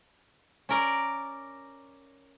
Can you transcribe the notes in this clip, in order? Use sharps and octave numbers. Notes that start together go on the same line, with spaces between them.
C#4 A#4 D5